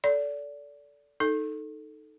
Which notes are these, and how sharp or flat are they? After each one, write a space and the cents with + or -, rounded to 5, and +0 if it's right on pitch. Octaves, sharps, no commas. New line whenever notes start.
A4 +0 D5 -25
D#4 +0 A4 +0